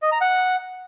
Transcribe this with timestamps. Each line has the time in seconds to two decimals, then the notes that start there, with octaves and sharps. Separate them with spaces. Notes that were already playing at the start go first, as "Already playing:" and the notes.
0.02 D#5
0.12 A#5
0.21 F#5